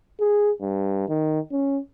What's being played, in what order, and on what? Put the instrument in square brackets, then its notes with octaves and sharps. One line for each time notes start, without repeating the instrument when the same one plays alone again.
[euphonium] G#4
G2
D#3
C#4